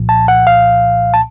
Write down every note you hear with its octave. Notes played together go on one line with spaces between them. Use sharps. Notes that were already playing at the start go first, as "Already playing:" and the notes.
Already playing: C2 A#2 F3
A5
F#5
F5
A5